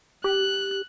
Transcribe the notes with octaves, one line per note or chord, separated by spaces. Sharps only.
G4 F#6